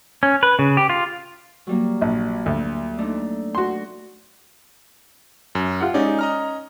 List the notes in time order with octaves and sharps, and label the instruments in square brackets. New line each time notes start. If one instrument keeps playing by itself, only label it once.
[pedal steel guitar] C#4
B4
C#3
G4
F4
[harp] F#3 G3 A#3
[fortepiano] A#1
D2
[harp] A3 D4 D#4
[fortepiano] F#4 C6
[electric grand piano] F#2
[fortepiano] F4 G4 F#5
[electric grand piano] G#3 D#4 D5 [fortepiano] C#4
[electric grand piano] D#5 A#5 F6